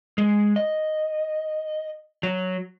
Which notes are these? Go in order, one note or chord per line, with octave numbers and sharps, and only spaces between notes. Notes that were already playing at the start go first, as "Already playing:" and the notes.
G#3
D#5
F#3